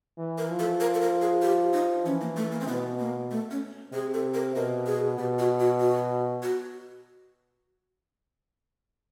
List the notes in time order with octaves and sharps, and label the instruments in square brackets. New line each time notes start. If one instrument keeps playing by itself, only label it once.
[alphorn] E3
[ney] A#4
[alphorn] F3
[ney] A4
A#4
A4
A#4
G#4
G4
D#4
[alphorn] E3 [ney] C#4
[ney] A#3
A3
A#3
C4
[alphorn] B2 [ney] B3
[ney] A#3
A3
C#4
[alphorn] C3 [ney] G#4
[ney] A4
A#4
[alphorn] B2 [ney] A#4
[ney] G#4
[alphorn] B2 [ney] G4
[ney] F#4
F#4
F#4
F#4